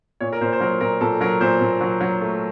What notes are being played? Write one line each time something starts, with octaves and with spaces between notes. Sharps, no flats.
A#2 C#5
A#4
A#2 C5
C5
F#3 A#4
A#2 A#4
A#2 A4
F#3 A#4
A#2 C5
A#2
F#3
F#3
A3